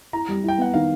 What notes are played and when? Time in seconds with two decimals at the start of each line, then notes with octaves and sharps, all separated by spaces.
0.13 E4 A#5
0.29 G3
0.44 E4 G5
0.58 B3 F#5
0.74 D#3 F5